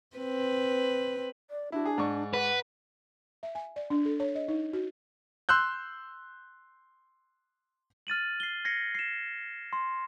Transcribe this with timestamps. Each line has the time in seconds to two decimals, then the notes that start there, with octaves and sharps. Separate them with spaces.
0.17 C4 B4
1.51 D5
1.72 D4 E4 F#4
1.85 G#4
1.98 G#2 D5 C#6
2.34 B4 F#5
3.43 E5
3.55 G#5
3.76 D5
3.90 D4
4.05 A4
4.20 C#5
4.35 D#5
4.48 D#4
4.73 F#4
5.49 C6 E6 F#6 G6
8.07 F6 A6 D#7 F#7
8.40 C7 G7
8.65 G#6 A#6 C7 C#7
8.95 C7 E7
9.73 C6